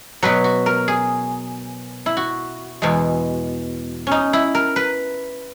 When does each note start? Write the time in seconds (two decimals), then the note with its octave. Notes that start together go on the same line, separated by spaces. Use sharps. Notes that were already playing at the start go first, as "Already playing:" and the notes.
0.22 B2 F#3 B4
0.44 F#4
0.66 A#4
0.88 G#4
2.06 E4
2.17 F#4
2.82 E2 B2 G#3
4.07 C#4 D#4
4.33 E4
4.55 A#4
4.76 B4